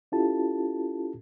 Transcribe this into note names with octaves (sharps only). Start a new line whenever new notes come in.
C#4 E4 F4 G4 A4 A5